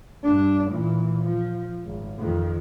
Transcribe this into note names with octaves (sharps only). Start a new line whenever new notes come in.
G2 D4
A#2 E3
F3
G#1
F2 D#3